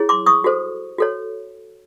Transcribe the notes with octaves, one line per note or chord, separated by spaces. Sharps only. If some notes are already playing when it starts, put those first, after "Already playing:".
Already playing: E4 G#4 C#5
C6 D6
C#6 D#6
F#4 A4 C5
F#4 A4 C#5